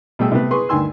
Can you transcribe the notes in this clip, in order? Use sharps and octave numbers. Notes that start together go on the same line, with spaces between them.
B2 G3 A3 G#4 G5 E6
C3 A3 B3
G#4 B4 C6 C#6
D2 G2 D#3 G#5 C6 E6